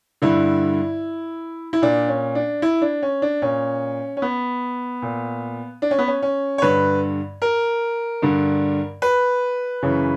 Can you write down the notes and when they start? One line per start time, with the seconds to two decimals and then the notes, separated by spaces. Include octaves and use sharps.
0.22 G2 D3 E4
1.73 E4
1.82 A#2 D4
2.08 C#4
2.35 D4
2.62 E4
2.82 D4
3.02 C#4
3.22 D4
3.42 A#2 C#4
4.17 C#4
4.22 B3
5.02 A#2
5.82 D4
5.91 C#4
5.99 B3
6.07 C#4
6.22 C#4
6.58 C#5
6.62 G2 D3 B4
7.42 A#4
8.22 G2 D3
9.02 B4
9.82 F#2 C#3 E3